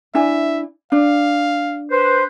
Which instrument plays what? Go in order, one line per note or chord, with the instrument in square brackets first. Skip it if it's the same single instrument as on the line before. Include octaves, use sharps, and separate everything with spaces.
[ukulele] D4 E4 G#5 [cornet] E5
[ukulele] D4 [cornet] F5
[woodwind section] B4 C5